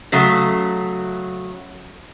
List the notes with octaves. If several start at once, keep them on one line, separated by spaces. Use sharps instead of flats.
C#3 F#3 A3